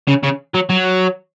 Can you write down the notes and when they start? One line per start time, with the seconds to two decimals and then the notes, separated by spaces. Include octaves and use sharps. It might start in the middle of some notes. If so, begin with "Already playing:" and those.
0.08 C#3
0.24 C#3
0.54 F#3
0.70 F#3